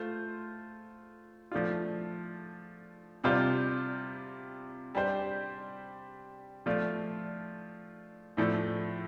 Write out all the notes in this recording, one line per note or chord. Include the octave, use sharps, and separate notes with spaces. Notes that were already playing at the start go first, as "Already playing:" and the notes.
Already playing: A3 F4 C5
F3 A3 D4 F4
C3 G3 D4 F4 C5
G3 D4 G4 C5
F3 A3 F4 D5
A2 F3 A3 D4 A4